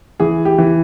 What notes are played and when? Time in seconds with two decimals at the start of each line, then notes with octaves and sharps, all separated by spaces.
0.20 E3 G#4
0.45 G4
0.58 E3